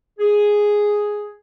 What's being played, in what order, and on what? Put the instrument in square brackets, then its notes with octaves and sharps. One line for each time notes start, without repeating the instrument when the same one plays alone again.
[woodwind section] G#4